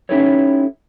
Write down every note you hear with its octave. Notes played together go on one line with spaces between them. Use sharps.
C#4 D#4 E4 G4 A4 C#5